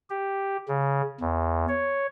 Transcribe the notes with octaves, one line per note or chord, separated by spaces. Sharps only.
G4
C#3
E2
C#5